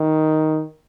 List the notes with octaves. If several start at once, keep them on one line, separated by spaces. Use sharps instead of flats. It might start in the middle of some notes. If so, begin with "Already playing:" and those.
Already playing: D#3